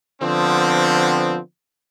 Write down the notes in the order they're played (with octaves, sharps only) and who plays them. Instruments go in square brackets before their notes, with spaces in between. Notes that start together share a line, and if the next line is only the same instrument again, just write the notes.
[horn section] D3 F3 B3 C4